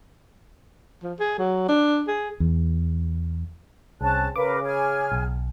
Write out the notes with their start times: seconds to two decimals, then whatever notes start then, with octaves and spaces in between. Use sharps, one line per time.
1.03 F3
1.20 G#4
1.39 F#3
1.69 D4
2.08 G#4
2.40 E2
4.01 C2 C4 C#4 G#4 A5 F#6
4.36 C#3 A#4 B4 F5 D6
4.64 G#4 G#5 F6
5.12 B1